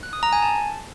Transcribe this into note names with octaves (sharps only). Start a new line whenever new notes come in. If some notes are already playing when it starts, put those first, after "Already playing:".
F#6
D#6
A#5
G#5
A5